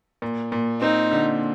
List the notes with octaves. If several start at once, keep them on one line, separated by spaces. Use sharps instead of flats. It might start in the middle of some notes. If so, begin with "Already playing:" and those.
A#2
A#2
C4 D#4
D3